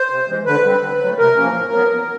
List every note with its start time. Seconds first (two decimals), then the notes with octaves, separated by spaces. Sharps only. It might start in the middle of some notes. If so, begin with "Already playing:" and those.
Already playing: C5
0.10 C3
0.28 E3 G#3
0.45 D3 B4
0.64 G3 C4
0.82 D3
1.00 F#3 A3
1.18 C3 A#4
1.36 F3 A#3 C#4
1.54 A2
1.72 F#3 B3
1.90 E2